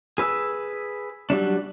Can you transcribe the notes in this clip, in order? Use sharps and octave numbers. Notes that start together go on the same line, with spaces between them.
G#4 B4 E6
F#3 G3 D4